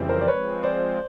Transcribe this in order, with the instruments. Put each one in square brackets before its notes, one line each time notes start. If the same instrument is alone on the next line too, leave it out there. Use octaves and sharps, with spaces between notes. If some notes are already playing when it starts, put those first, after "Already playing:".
Already playing: [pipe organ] F2 C#3 E3 G3 C4
[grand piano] A#4 C5
D5
[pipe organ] F3 G#3 C4 [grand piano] B4 C#5
[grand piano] C5 D5